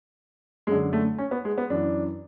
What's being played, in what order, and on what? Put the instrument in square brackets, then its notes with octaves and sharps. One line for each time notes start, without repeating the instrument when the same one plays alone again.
[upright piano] F#2 D3 G#3
A3
C#4
B3
G#3
B3
F#2 E3 D4